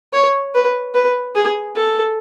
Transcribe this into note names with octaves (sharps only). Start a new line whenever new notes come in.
C#5
B4
B4
G#4
A4